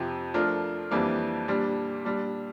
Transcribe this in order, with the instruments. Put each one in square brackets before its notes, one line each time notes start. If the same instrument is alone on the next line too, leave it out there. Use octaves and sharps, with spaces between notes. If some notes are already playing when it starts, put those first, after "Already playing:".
Already playing: [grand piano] F2 C3 F3 C4 G4
F3 A3 D4 F4 A#4
F2 E3 G3 A#3 D4
A#2 G3 D4
A#2 G3 D4